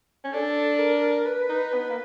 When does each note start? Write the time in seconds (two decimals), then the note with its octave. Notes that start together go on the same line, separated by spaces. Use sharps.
0.24 C#4
0.33 D4 A4
0.79 A#4
1.26 B4
1.49 D#4
1.73 B3
1.89 A#3